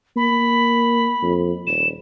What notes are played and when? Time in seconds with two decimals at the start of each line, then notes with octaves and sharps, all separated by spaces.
0.16 A#3 B5
1.22 F2
1.67 D#1 E7